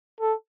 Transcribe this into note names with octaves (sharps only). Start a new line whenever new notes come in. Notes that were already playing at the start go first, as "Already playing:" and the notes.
A4